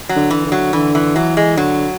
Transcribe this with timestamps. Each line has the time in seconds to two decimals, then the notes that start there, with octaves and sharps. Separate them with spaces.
0.09 F#3
0.16 D3
0.31 E3
0.45 D3
0.52 F#3
0.73 D3 E3
0.95 E3
1.15 E3 F#3
1.37 G#3
1.57 D3 F#3